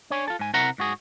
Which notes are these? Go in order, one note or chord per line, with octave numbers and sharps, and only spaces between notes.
D4 C#5 G#5
F4 A4
G#2 G#5
C3 E4 A#4 E5 F#5 A#5
G#2 F#4 G#4